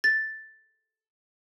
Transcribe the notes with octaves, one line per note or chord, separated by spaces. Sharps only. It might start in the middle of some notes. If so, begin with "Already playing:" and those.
A6